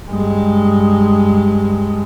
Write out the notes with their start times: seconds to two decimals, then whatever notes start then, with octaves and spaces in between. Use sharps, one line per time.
0.10 G2 G#3